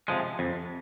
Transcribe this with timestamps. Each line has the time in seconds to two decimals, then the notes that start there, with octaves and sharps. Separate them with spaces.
0.08 C3 F3 G#3
0.39 F2